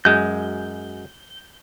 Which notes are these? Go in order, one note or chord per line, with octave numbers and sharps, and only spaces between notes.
F#2 G#3 G6